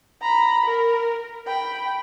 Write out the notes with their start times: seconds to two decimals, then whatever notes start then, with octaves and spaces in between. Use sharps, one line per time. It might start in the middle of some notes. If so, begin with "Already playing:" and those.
0.22 A#5 B5
0.66 A#4
1.47 G5 B5